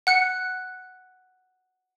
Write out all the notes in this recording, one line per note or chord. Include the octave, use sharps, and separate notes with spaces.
F#5 F#6 C#7